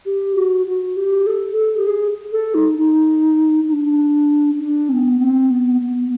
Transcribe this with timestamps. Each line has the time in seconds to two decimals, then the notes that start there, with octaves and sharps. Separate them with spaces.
0.05 G4
0.35 F#4
0.66 F#4
0.97 G4
1.26 A4
1.57 A4
1.77 G4
1.87 G#4
2.32 A4
2.54 D#4
2.78 D#4
3.68 D#4
3.72 D4
4.60 D4
4.89 C4
4.93 B3
5.20 C4
5.50 B3
5.81 B3